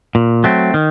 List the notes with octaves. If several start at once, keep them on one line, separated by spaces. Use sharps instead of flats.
A#2
F#3 A3 C4
D#3